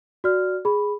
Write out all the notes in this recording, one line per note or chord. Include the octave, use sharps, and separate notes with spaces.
F#4 D5 F6
G#4 B5